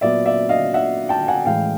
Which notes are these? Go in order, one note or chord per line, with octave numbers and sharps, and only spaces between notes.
A#2 F#3 B3 D5 E5
D5 E5
D#5 F5
E5 F#5
G5 A5
F#5 G#5
A2 E3 G#3 F5 G5